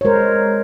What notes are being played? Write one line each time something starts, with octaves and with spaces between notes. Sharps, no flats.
C#5
G#3 A#4 C5